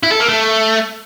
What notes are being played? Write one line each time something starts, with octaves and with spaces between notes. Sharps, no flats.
E4
A4
A#3
A3